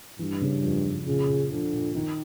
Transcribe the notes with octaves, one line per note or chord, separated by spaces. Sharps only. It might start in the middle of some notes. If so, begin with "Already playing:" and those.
G2 E3
C#3
F2
F2
A#2 C#3
A#2
D3 F3
A#2
D#3